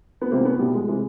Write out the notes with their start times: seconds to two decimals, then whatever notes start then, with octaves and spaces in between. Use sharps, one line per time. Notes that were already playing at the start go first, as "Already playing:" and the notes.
0.21 B3
0.31 C#2 C3 E3 A#3 C4
0.45 B3 C#4
0.59 C2 B2 G3
0.74 G#3
0.88 C3 E3 G#3